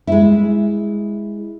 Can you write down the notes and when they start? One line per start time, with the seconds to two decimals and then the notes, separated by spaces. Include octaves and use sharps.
0.07 G#3 E4